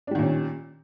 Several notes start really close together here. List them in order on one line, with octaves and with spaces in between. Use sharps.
D4 G3 D#3 A#2 C#4